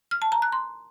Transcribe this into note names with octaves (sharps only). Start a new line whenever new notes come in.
F6
A5
A#5
F#6
C6